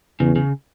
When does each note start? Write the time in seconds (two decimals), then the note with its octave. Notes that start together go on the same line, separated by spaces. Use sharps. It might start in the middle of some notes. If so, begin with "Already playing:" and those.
0.20 E2 C#3
0.36 C#3